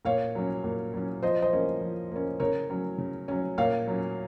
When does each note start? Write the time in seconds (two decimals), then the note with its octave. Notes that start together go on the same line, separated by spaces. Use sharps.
0.05 A#2 C#5 F5
0.35 F#3 C#4
0.64 A#2
0.94 F#3 C#4
1.22 F3 C5 D#5
1.42 C5 D#5
1.53 A#3 C#4
1.81 F3
2.11 A#3 C#4
2.40 C#3 A#4 C#5
2.70 F#3 C#4
2.98 C#3
3.28 F#3 C#4
3.58 A#2 C#5 F5
3.87 F#3 C#4